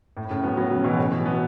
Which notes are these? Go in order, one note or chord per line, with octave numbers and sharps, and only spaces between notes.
A2
A2 C#3
F#3 B3
F#3 B3
C#3 F#3
B2 E3
A2 C#3
B2 E3
F#3 B3